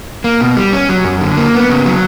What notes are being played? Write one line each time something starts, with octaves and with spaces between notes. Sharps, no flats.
A#3
B2
G3
C#4
F#3
F#2
D3
A#3
B3
C#3
F#3